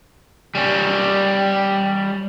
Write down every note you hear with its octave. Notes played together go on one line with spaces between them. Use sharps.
G3 C#4